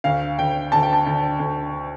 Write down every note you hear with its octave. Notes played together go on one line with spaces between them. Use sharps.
D2 F5
D2 G5
D2 A5
G5
A5
D2
D2